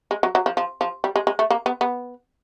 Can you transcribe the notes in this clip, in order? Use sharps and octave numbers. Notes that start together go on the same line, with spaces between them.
G#3
F#3
F#3
F3
F3
F3
G3
G#3
G#3
A3
A#3
B3
B3